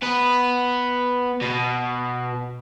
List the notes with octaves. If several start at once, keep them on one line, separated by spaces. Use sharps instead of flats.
B3 B4
B2